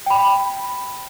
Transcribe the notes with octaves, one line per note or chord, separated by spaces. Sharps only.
G5 B5